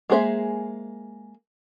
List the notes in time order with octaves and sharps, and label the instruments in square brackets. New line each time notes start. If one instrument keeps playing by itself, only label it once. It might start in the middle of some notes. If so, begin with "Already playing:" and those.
[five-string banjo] G#3 A#3 G#4 C5 E5